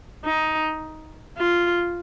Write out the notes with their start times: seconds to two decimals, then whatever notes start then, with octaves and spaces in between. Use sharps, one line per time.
0.25 D#4
1.37 F4